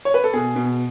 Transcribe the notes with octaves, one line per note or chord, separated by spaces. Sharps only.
C#5
B4
A4
B2 G#4
B2